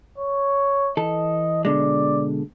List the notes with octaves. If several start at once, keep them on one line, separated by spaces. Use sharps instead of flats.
C#5
E3 A4 D#5
B2 D3 G#3 D5